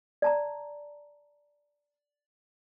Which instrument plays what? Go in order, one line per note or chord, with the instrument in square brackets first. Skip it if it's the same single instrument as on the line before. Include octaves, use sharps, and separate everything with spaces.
[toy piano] D5 A5 A#5